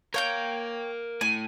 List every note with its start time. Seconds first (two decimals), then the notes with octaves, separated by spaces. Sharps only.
0.14 A#4 C#5 F5 G5 G6
1.21 A2 G#5